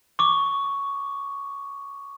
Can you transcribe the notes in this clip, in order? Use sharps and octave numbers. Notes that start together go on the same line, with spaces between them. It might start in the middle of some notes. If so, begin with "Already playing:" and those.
C#6 D6